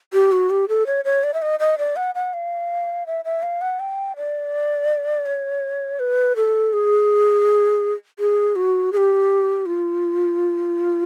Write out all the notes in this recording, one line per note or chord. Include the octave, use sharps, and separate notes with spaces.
G4
F#4
G4
A4
C#5
C#5
D5
E5
D#5
D#5
D5
F#5
F#5
F5
E5
E5
F5
F#5
G5
D5
C#5
B4
A4
G#4
G#4
F#4
G#4
G4
F4